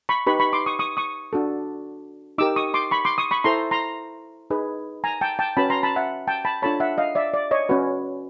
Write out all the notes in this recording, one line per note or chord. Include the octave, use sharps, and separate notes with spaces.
B5 C#6
D#4 G4 B4 B5 C#6
B5 C#6
C6 D6
C#6 D#6
C#6 D#6
C#6 D#6
D4 F#4 A4
D#4 G4 A#4 D6 E6
C#6 D#6
C6 D6
B5 C#6
C6 D6
C#6 D#6
B5 C#6
E4 A4 C5 A#5 C6
A#5 C6
D#4 G#4 B4
G#5 A#5
G5 A5
G5 A5
C#4 F#4 B4 A5 B5
A#5 C6
A5 B5
E5 F#5
G5 A5
A5 B5
D4 F4 A4 C#5 A5 B5
E5 F#5
D#5 F5
D5 E5
D5
C#5 D#5
C#4 F#4 B4